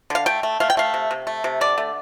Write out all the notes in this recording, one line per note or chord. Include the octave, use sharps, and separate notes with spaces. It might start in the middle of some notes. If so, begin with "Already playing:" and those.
D3 F5
A3 G5
A3
A3 F5
G5
A3 F5
C3
C3
A3
C3
D3 D5
A3